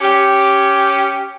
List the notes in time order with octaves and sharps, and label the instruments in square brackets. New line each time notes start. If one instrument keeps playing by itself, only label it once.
[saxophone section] C#4 G4